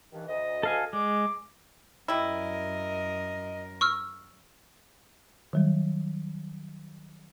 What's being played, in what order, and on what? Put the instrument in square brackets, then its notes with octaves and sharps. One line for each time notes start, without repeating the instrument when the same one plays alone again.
[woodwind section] G2 D#3 E3
D2 D#5
[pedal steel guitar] A4 F5 G#5
[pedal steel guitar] G#3 [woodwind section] D6
[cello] F#2 A#4 [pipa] G3 E4 [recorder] D#5
[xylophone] C#6 E6 F6
[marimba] D#3 F#3 G3